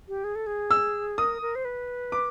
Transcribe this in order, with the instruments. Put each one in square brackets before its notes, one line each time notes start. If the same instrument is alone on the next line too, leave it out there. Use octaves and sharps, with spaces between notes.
[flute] G4
G#4
A4
G#4
[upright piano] E6
[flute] A#4 [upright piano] D#6
[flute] A#4
C5
B4
[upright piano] D6